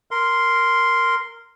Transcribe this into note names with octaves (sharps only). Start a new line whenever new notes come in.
A#4 C6